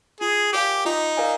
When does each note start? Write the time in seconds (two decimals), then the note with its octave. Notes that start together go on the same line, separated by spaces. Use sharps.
0.21 F4 G#4
0.53 G4 A#4 D5 F5 G#5
0.85 D#4 F4
1.17 A#4 D5 F5 G#5